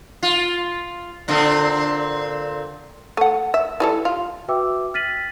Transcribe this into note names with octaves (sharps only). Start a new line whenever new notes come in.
F4
A#2 D3 C4
A3 F#5
E5
E3 G3 A4
F4
F#4 B4 E5 G5 D6 E6
F6 A6 B6 D#7 F#7